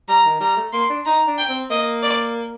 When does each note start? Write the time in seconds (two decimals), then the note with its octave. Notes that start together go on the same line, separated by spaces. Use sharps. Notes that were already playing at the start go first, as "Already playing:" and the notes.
0.09 G3 A#5
0.25 D#3
0.40 G3 A#5
0.57 A3
0.73 A#3 C6
0.90 D4
1.06 D#4 A#5
1.27 D4
1.38 G5
1.49 C4
1.70 A#3 D#5
2.03 D5